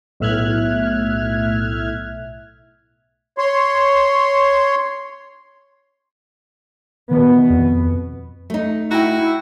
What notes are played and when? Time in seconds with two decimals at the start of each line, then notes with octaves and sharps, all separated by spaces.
0.20 B1 A2 E5 F6 F#6 G#6
3.38 C#5 C6
7.11 B2 D#3 B3
7.50 F2
8.50 A3 D#4
8.91 E4 F#4 G5 A#5